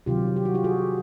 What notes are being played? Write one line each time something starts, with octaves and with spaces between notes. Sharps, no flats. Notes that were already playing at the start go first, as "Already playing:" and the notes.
C3 D#3 F#3 F4 G4
G4
F#4
F4 G4
F#4 G#4